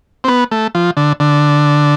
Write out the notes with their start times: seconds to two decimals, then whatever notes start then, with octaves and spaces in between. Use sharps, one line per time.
0.24 C4
0.28 B3
0.51 A3
0.75 F3
0.97 D3
1.20 D3